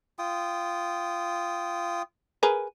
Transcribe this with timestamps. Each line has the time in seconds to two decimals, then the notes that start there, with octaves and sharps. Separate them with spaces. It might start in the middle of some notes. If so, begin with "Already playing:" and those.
0.19 F4 G5 D#6
2.43 G#4 A#4 B4